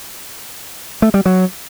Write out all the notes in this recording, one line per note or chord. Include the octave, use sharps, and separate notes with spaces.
A3
G3
F#3